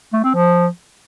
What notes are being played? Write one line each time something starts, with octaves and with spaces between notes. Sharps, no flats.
A3
C4
F3